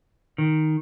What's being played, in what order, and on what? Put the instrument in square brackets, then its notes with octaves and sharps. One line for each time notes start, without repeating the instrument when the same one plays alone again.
[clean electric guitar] D#3